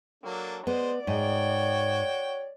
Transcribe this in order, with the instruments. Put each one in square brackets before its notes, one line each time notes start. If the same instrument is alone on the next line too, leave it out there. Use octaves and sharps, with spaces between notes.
[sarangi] F#3 [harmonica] A#3 D4 A4
[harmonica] G#3 C5 [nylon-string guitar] B3 [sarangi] D5
[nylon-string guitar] G#2 [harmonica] F#4 G5 [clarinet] C#5